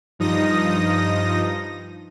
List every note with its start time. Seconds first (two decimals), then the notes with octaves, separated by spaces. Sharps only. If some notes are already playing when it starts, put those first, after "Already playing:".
0.19 G2 F3 D#4 D#6 A#6